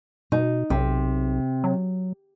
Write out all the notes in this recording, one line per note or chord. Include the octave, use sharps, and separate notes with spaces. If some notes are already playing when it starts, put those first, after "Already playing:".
B2 D#4
B1 C3
F#3